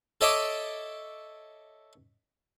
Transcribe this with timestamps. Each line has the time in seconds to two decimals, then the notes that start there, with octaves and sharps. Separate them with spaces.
0.21 A4 C#5 D#5 E5 A5 D6